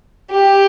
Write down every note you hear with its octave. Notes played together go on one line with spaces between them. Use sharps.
G4